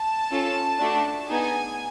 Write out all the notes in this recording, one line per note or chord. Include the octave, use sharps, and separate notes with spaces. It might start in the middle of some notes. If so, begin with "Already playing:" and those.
Already playing: A5
C#4 F4 A4
A3 D4 F#4
B3 D#4 G#4 G#5